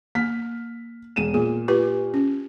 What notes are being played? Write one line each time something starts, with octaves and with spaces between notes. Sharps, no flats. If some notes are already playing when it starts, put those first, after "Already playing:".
A#3 F6 B6
E1 D#7 E7
A#2 G#4
F4 G4 B4
C#4